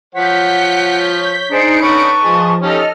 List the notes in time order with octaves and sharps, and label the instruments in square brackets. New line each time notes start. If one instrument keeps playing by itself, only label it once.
[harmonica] F3 C#5 [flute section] F#5 [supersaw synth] G6 B6
[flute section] D4 G#4 C5 [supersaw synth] D#4 C#7 D7
[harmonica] D3 C#4 B5 [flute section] B4 A5 C#6
[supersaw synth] F3 [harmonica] G#4 D#5
[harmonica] C#4 D#4 G4 [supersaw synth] A4 D#5 F6